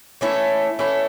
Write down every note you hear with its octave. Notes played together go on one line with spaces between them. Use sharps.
E3 A3 C#4 E4
E3 A3 C#4 E4